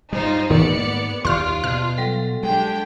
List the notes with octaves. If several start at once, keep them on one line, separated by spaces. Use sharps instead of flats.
G2 G3 D#4 F4 C5
E2 G#2 D#3 A#3 B3 D5 C#7
D#2 F4 G4 D5 C6 F6
B2 F6
F#3 G3 A4
G#3 D4 G4 G5